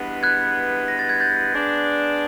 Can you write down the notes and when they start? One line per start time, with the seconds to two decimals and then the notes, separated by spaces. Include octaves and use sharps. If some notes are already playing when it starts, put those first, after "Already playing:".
Already playing: G2 E3 G#3 B3
0.23 F#6 G#6
0.88 A#6
0.99 A6
1.09 G#6
1.20 G6 A6
1.54 G#3 B3 D4